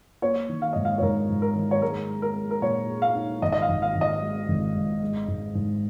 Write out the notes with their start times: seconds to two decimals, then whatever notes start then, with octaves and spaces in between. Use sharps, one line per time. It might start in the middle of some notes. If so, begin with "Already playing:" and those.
0.22 A#3 C#5
0.49 D#3
0.62 F5
0.73 G#2 D#5
0.85 F5
0.98 C#5
1.02 G#2 A#4
1.29 G#2
1.42 A#4
1.55 D#3
1.71 C#5
1.82 G#3 A#4
2.09 G#3
2.22 A#4
2.36 G#3
2.51 A#4
2.62 A#2 C#5
2.89 G#4
3.02 F5
3.15 D#4
3.42 G#1 D#5
3.52 D#5
3.62 F5
3.69 G#1
3.82 F5
3.95 G#1
4.01 D#5
4.22 G#3
4.48 G#1
4.75 G#2
5.02 G#3
5.28 G#2
5.55 G#2